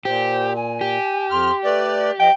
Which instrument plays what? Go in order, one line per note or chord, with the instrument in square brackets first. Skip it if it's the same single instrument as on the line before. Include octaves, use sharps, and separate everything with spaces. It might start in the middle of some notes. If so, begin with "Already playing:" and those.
[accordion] A#2 [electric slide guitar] G4 [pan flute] C5
[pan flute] G#5
[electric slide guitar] G4
[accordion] F2 F6 [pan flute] C6
[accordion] A3 D5 [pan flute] B4
[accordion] F3 [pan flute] D#5 [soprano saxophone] G5